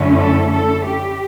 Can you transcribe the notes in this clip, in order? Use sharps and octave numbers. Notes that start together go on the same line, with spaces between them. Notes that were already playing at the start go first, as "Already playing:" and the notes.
Already playing: F#2 D3 A3 C#4 E4
A4
A4
G4